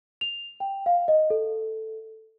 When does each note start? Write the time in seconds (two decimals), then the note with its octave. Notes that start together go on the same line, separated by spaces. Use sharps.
0.21 F7
0.60 G5
0.86 F5
1.08 D#5
1.30 A4